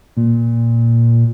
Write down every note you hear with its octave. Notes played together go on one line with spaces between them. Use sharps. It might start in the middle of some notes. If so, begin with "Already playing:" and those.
A#2